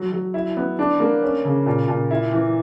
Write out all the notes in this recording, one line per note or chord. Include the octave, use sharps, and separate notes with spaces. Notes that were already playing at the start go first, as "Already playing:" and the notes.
Already playing: F#3
F#3
E4
B3
D4
A#3
C#4
C#3
A#2
A#2
E4
E3